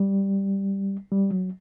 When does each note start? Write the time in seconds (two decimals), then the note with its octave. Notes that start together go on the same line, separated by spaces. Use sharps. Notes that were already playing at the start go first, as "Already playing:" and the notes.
Already playing: G3
1.12 G3
1.31 F#3